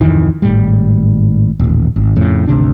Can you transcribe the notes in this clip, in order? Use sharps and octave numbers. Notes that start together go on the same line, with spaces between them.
D1 F2 D#3 E3
G#1 A2 G3
D#1 A1
G#1
F2 A2 C#3
G#1 D2 C3 D4